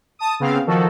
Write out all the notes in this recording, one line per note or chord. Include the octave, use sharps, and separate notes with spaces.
A5 D#6
C#3 B3 C4 F5
D#3 F3 F#4 A4